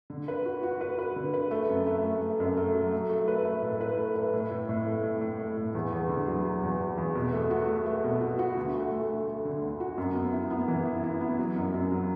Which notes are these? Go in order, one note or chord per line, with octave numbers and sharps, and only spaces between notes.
D3
B4
F#4
F#4
B4
B4
D3
B4
A3
F#2
A3
A3
A3
F#2
A3
F#3
A3
A3
B4
A3
A2
B4
A3
B4
A2
A2
A2
A3
A2
A2
A3
A2
E2
E2
D3
F#3
F#3
E2
E2
E2
B2
A3
F#4
A3
A3
B2
F#4
F#4
D2
A3
A3
A3
A3
D3
D2
F#4
F#2
B3
E4
B3
E3
E4
E4
B3
F#3
F#2
F#2
F#3